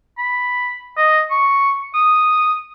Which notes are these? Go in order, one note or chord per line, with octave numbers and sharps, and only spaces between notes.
B5
D#5
C#6
D#6